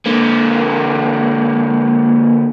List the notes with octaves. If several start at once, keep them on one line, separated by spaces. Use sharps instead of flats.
D3 A#3